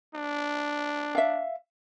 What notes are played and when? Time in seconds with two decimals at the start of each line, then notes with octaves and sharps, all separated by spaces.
0.15 D4
1.15 E5 F5